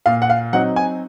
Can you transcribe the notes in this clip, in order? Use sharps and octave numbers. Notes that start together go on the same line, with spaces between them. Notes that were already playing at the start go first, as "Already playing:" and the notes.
A#2 F5
F#5
F5
F#3 C4 D#4 F#5
G#5